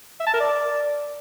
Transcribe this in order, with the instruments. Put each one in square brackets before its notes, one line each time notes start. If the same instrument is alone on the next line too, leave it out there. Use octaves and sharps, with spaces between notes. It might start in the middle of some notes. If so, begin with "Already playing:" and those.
[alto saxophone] E5
A5
A#4
D5